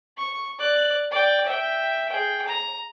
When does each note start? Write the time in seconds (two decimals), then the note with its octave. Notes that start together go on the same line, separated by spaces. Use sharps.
0.17 C#6
0.59 D5 F#6
1.11 D5 G5
1.46 E5 G5
2.09 G#4 G5
2.48 A#5